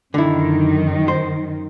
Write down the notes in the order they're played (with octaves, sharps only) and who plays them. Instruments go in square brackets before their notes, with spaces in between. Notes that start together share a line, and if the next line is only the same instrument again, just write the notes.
[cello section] F#2 D#3 [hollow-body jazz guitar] D3 E4
[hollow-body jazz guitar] C5